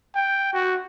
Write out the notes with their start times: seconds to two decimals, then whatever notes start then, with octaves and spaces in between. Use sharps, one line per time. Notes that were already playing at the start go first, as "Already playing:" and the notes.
0.15 G5
0.54 F#4